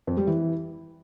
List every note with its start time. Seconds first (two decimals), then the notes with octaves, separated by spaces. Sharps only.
0.07 F2
0.17 G3
0.27 E3